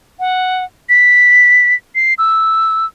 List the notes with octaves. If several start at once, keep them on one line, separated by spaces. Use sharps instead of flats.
F#5
B6
C7
E6